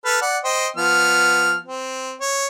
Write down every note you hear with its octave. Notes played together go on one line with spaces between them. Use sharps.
A4 B4 F6
D5 F#5
C5 D#5 G5
F3 B3 F6
C4
C#5